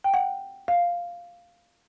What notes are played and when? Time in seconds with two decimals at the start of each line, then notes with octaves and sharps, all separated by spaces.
0.04 G5
0.14 F#5
0.68 F5